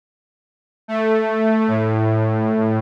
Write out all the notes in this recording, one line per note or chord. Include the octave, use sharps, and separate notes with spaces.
A3
A2